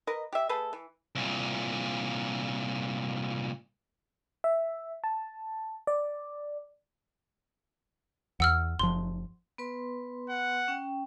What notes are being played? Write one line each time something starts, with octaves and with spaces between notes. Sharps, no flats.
A#4 B4 D#5
G4 E5
A3 G#4 A4 B4
E3
C2 A#2
E5
A5
D5
E2 F#5 E6 F6
F#1 F3 C6
B3 B4 C6
F#5
C#4 G5